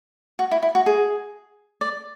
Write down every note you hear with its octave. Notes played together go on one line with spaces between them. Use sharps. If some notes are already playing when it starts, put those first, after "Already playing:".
F#4
E4
E4
F#4
G#4
D5